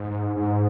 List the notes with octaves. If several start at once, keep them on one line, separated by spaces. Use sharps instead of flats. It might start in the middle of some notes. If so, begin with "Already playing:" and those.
Already playing: G#2
G#2